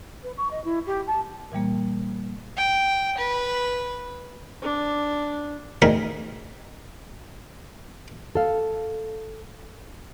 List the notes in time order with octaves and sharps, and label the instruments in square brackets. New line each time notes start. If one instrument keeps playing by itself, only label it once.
[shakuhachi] B4
C#6
D#5
E4
G4
A5
[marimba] A#2 E3 G3 A#3
[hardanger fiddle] G5
B4
[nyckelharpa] D4
[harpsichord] D2 D#3 D#4 G#4 A#4 B5
[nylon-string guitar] A4 F5